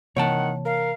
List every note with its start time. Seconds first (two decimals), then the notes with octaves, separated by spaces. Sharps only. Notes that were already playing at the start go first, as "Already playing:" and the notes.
0.17 C3 D#3 E3 A#3 C#5 F#5 G5 A5
0.65 A#4 F5